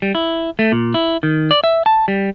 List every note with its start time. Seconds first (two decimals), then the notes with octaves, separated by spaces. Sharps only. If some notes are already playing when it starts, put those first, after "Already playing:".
0.02 G3
0.15 E4
0.59 A3
0.72 A#2
0.94 E4
1.23 D#3
1.51 D5
1.64 E5
1.86 A5
2.08 G3